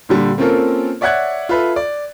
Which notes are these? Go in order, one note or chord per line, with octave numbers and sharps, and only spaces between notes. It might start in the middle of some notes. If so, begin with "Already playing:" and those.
A#2 D3 G3
A#3 C4 C#4 F4 A4 A#4
C#5 D5 E5 F#5 F#6 G#6
F4 A4 B4 E5
D5